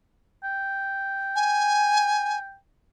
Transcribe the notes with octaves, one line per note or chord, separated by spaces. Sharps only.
G5
G#5